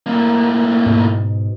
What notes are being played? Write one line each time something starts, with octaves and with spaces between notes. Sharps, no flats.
A2 A#3
G#2 B2